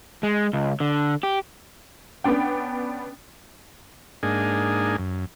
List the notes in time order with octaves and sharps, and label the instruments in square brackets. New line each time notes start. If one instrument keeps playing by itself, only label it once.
[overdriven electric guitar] G#3
C#2
D3
G4
[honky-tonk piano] B3 C#4 D4 G5
[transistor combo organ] G#2 A#3 D4 D#4 G#4 G#5
F#2